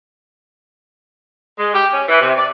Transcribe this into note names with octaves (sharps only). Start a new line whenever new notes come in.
G#3
G4
C#4
E3
C3
D5